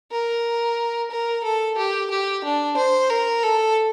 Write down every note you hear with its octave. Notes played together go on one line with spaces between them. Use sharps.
A#4
A#4
A4
G4
G4
D4
C5
A#4
A4